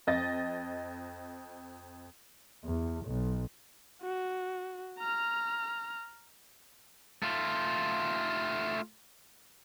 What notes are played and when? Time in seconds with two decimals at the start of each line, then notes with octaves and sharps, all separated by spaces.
0.07 F2 D#5 A6
2.64 E2
3.05 B1
4.02 F#4
4.99 A#5 F6
7.23 A3 F4